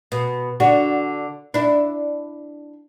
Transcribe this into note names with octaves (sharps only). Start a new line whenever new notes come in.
B2
D3 D4 F#4
D4 E4